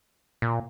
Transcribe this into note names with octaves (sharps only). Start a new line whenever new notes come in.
A#2